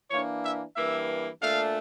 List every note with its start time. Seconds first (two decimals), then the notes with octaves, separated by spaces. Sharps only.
0.10 E3 A#3 D4 C#5
0.43 E5
0.76 G2 E3 A#3 E5
1.42 A#2 A3 D4 F5